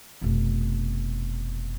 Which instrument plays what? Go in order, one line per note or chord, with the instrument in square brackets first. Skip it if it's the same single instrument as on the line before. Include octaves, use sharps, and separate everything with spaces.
[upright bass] F1 B2